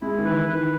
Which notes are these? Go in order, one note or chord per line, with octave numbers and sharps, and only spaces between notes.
G#3 E4
D#3
E3 B4
D#3 B4